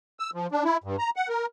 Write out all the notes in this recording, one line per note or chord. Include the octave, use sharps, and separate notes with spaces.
E6
F3
D4
E4
G2
A#5
F#5
A#4